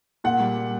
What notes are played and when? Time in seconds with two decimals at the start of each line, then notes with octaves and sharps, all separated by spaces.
0.24 A#2 F#5
0.40 G3